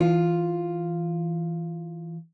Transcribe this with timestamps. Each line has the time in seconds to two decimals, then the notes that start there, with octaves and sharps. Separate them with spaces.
0.01 E3 F4